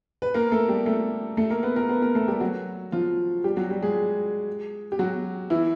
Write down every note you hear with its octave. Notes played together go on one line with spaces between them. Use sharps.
B4
A#3 A#4
A3 A4
G3 G4
A3 A4
A3 A4
A#3 A#4
B3 B4
A#3 A#4
B3 B4
A#3 A#4
A3 A4
G3 G4
F#3 F#4
F3 F4
G3 G4
F#3 F#4
G3 G4
G#3 G#4
G4
F#3 F#4
E3 E4